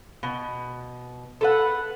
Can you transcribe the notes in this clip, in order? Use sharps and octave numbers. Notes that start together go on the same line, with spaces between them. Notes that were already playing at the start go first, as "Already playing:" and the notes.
B2
A4 B4 F#5